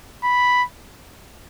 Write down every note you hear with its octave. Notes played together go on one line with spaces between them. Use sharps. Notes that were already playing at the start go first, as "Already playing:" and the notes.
B5